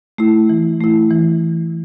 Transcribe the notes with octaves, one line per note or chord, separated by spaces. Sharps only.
A3 E4
E3
A3 E4
E3